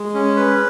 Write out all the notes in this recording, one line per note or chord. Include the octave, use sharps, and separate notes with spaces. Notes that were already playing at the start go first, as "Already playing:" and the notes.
Already playing: G#3
C#4
B4